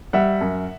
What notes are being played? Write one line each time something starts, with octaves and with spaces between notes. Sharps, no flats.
G3 E5 F#5
F#2